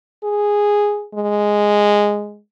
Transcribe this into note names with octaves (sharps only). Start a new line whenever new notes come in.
G#4
G#3